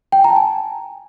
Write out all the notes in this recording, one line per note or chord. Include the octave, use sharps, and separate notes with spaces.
G5
G#5
A#5
A5
G#5